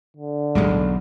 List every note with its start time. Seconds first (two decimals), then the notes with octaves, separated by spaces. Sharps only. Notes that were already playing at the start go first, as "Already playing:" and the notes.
0.17 D3
0.55 B1 E2 A2 G3 G#3